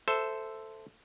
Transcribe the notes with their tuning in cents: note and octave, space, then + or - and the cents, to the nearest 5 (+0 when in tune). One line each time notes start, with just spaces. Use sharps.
A4 +0 C5 -10 E5 +0